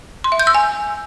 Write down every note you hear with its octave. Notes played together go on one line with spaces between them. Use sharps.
C6
E5
G6
E6
G#5